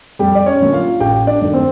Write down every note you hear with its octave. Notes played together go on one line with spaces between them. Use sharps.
F2 G3 G4
D5
C#4 C#5
D3 F#3 A#3
F4 F5
A1 G4 G5
D4 D5
G2 D#3 F#3 A3
C4 C5